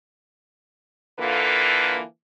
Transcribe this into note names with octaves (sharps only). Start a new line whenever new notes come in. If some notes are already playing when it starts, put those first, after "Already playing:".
D3 E3 A#3 F4 A4 B4